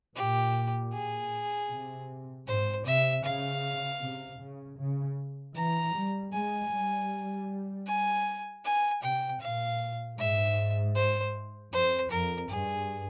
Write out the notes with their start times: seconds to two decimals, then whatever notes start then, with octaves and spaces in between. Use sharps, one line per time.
0.16 A#2 G4
0.93 G#4
1.70 C3
2.47 G#2 C5
2.85 C3 E5
3.24 C#3 F5
4.01 C3
4.40 C#3
4.79 C#3
5.55 E3 A#5
5.94 G3
6.33 G#3 G#5
6.72 G3
7.87 G#5
8.65 G#5
9.03 C3 G5
9.41 A#2 F5
10.18 G#2 E5
10.95 C5
11.72 F2 C5
12.11 F2 A#4
12.49 G2 G#4